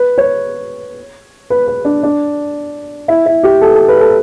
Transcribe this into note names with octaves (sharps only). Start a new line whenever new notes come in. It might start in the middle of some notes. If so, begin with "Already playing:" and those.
Already playing: B4
C#5
B4
B4
D4
D4
E4
E4
G4
A4
A4
B4
A4